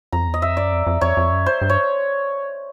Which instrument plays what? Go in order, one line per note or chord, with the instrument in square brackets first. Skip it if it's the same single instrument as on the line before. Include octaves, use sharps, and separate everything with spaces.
[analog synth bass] F2 [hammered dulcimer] A#5
[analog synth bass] E2
[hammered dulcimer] D#5
[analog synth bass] F2 [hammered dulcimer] E5
[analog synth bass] F#2 [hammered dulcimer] D5
[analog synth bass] F2
F2
[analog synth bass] F2 [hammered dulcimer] C#5
[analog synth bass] F2
F#2
[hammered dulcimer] C5
[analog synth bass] G2
[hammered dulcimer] C#5